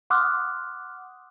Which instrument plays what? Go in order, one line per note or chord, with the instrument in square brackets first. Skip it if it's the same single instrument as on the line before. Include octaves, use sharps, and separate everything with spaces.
[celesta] F#5 C6 D6 D#6 F6 F#6